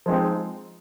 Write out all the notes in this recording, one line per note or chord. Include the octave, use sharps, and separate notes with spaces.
F3 G#3 C4 D#4